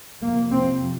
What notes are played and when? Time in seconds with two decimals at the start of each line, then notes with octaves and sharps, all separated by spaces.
0.22 F2 C3 A#3
0.50 C4